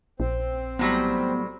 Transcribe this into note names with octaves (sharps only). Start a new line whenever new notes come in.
A#1 C4 C5
A2 F#3 G3 B3